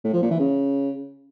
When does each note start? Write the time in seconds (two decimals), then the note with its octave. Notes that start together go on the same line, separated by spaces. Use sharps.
0.05 A2
0.13 F3
0.22 A#2
0.31 E3
0.40 C#3